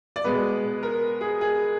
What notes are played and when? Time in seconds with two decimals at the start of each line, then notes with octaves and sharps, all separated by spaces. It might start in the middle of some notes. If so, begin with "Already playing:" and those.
0.16 D5
0.24 B2 G#3 B3 B4
0.83 A#4
1.21 G#4
1.41 G#4